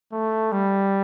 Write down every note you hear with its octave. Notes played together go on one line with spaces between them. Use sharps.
A3
G3